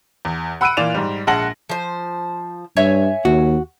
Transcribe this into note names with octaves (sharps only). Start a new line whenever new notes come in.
E2
F#5 B5 E6 F#6 D7 D#7
A#2 E3 F4 D5 E7 F7
G#2 G3
A#1 G#3 F#5 A5 A#6 F#7
F3 C5
G2 C#5 E5 G#5
D#2 F#4